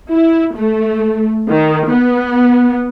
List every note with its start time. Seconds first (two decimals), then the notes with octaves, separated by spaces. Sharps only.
0.10 E4
0.56 A3
1.49 D#3
1.89 B3